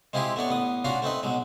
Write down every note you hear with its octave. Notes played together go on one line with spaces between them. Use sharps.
G#3 C4 E4 F4 G4 G#4
A3 B3 D4 C#5
A1 B3 D#6
C#4 D4 F4 F#4 F5
A3 C4 D#4 B4
B1 F#3 G#3